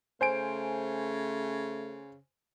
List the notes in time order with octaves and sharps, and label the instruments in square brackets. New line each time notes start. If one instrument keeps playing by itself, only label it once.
[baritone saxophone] C#3 [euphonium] A3 [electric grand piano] C5 G#5 D7